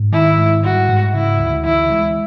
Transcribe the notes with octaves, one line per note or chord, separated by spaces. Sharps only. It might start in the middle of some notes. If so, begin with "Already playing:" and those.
Already playing: G#2
D#3 E4
G#2
G3 F#4
G#2
C#3 E4
D2
E3 E4
G#3